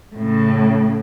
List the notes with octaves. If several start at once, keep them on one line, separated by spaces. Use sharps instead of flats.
A2 C#3